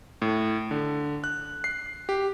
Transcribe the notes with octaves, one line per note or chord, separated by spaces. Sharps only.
A2
D3
F#6
C7
G4